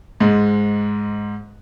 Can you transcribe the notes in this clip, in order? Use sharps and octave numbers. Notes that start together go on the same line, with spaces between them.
G#2 G#3